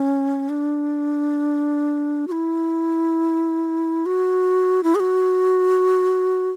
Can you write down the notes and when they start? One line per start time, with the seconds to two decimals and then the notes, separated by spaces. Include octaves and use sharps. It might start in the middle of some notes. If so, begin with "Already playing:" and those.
Already playing: C#4
0.49 D4
2.28 F#4
2.32 E4
4.06 F#4
4.83 E4
4.95 G#4
5.00 F#4